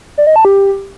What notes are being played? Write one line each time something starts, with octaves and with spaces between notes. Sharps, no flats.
D5
D#5
A5
G4